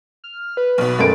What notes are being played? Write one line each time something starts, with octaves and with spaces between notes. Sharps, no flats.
F6
B4
B1 B2
F#1 A3 A6 D7